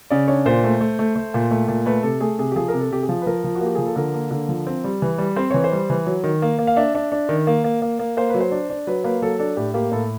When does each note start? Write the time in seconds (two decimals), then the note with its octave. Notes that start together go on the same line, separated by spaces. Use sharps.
0.10 C#3 D5
0.28 D4 C#5
0.46 A#2 C5
0.64 A3
0.81 A3
0.99 A3
1.16 A3
1.34 A#2
1.51 A3
1.68 A#2
1.86 A3 B4
2.03 C3 A4
2.21 A3 G#4
2.39 C3 G#4
2.52 G4
2.56 F3 G#4
2.68 A#4
2.74 C3
2.80 A4
2.91 C3 G4
3.03 G#4
3.09 F3
3.21 B4
3.27 F3 A#4
3.44 F3
3.55 F#4
3.61 A#3 G4
3.75 F3 G#4
3.86 A4
3.96 D3 A#4
4.14 A#3
4.31 D3
4.49 F3
4.67 C4
4.84 G3
5.02 E3
5.18 G3
5.36 C4 C5
5.51 E3 C#5
5.64 C5
5.72 G3
5.90 E3
6.06 F#3
6.24 D#3
6.42 A#3
6.59 A#3
6.67 F5
6.76 D4 E5
6.95 D4
7.12 D4
7.29 D#3
7.47 A#3
7.64 A#3
7.82 A#3
7.99 A#3
8.17 A#3 C5
8.29 F#3 B4
8.40 C5
8.51 D4
8.70 D4
8.87 F#3 B4
9.04 A#3 B4
9.22 F#3 A4
9.39 D4 A4
9.57 A2 G4
9.74 A#3 G4
9.92 A2 A4